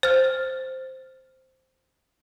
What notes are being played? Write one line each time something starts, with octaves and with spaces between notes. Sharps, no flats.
C5 F6